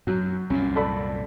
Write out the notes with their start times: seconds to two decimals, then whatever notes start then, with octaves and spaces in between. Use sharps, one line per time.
0.07 F#2 F#3
0.50 C2 F#2 A#2 C#4
0.75 A4 D5 B5